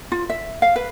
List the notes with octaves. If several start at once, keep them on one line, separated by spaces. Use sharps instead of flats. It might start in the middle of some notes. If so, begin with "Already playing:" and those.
F4
E5
F5
B4